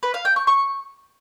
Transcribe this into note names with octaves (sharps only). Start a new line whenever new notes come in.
B4
F5
G5
C#6
C#6